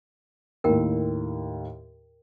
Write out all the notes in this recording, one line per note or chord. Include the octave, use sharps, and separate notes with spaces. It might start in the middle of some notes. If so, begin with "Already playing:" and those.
D#2 A2 A#4 G5